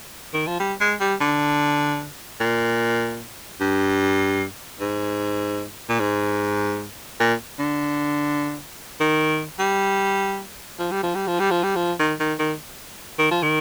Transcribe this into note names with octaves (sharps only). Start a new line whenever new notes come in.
D#3
F3
G3
G#3
G3
D3
A#2
G2
G#2
A#2
G#2
A#2
D3
D#3
G3
F3
G3
F3
G3
F3
G3
F3
G3
F3
D#3
D#3
D#3
D#3
F3
D#3